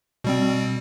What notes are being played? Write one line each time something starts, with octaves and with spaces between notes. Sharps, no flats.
B2 G3 C4